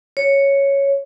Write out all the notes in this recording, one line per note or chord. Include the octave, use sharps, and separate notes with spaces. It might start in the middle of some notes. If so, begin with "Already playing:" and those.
C#5